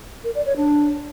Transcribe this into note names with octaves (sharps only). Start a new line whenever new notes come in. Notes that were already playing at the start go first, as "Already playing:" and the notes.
A#4
D5
C#5
D4